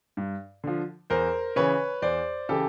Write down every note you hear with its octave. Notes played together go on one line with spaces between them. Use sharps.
G2
D3 F3
E2 A#4 C5
C#3 E3 B4 C#5
E2 C5 D5
C#3 E3 G4 A4